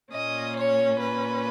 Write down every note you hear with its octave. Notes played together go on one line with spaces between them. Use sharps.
A#2 A#3 C#4 D#5
C#5
B4